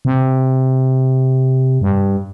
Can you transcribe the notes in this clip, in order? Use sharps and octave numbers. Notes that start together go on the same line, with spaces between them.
C3
G2